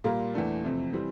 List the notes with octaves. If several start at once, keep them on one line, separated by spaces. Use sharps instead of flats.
A#2 G3 A#3 F4 A#4
E2 E3 A3 D4
F2 C3 E3
E3 G3 C4